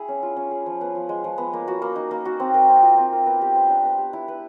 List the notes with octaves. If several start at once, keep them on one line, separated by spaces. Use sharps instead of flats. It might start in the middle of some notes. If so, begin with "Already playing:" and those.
Already playing: E4 G#4
C#4
F4
C#4
G#4
F3
B3
F3
G#3
F3
B3
A#3
F#4
A#3
D#4
A#3
F#4
C4
A#4
C4
F4
C4
A#4
B3
G4
C5
D4
B3
G4
E4
B4